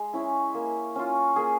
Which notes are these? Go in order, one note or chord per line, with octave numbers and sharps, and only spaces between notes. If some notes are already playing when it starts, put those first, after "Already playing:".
Already playing: G#3
C#4 E4
A#3
C#4 F4
A#3 G#4